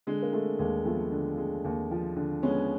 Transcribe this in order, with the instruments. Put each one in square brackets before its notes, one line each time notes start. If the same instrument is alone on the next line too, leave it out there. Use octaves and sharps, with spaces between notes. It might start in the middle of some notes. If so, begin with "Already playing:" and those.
[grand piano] D3 G#3
A#3
G#3 A3
D#2 G#3
F3 A3 B3
D3
G#3
D#2
F3
D3
G#3 B3 C#4